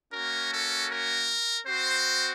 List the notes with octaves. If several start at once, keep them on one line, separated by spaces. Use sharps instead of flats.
A#3 C#4 F#4 A#4
A4
A#4
C4 F#4 C5